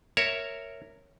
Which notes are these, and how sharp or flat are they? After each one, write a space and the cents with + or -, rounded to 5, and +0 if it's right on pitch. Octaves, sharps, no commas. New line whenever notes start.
A#4 -10 C#5 +0 E5 +0